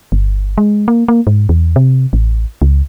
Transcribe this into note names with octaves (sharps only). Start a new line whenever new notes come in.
G1
G#3
A#3
A#3
G#2
E2
C3
A1
C#2